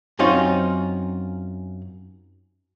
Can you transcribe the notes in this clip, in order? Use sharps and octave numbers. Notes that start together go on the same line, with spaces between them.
F#2 C4 C#4 D#4 F4